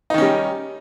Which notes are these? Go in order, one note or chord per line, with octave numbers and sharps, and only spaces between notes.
D#3 G3 C#4 D#4